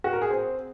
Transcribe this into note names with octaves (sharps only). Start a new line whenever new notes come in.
F#4
A#4
G#4
C4